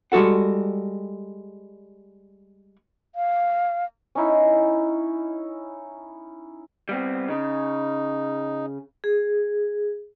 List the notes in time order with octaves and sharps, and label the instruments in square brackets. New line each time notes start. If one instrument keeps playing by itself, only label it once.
[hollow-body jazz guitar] G3 G#3 F#4 A4 F#5
[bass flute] F5
[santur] C#4 D#4 E4
[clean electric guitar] G3 B3 C4
[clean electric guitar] C#3 [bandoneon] D#4
[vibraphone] G#4